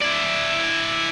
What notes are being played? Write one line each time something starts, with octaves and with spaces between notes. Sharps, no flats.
E4 D5